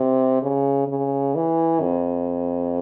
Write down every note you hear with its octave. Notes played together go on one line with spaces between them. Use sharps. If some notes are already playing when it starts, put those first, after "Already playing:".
Already playing: C3
C#3
C#3
E3
F2